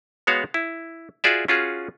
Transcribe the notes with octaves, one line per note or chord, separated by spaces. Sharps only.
G#3 B3 F#4 C#5 F5
E4
F4 F#4 G#4 D5 E5
C#4 F4 F#4 G#4